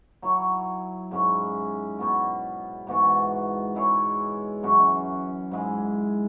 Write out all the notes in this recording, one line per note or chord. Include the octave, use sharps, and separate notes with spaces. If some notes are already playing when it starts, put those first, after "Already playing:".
F#3 E4 C#5
G#2 G#3 C#4 E4
B2 B3 F#4
G#2 E3 B3 F#4
G#3 E4 G#4 C#5
F#2 E3 C#4 F#4
G#2 G#3 E4 G#4